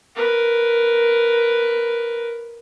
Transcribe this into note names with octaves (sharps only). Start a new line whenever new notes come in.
A#4 B4